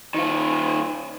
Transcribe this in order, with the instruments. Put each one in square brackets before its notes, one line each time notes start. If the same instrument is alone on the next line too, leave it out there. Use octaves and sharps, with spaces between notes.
[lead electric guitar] D#3 F4